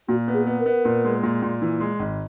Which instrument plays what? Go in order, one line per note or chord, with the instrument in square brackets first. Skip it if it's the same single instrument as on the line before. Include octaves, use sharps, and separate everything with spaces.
[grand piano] A#2 [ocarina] F#4
[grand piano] B3
[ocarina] G#4
[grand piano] B3
[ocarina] A#4
[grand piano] B3
A#2
G#3
A#2
A#2
E3
G#3
G#1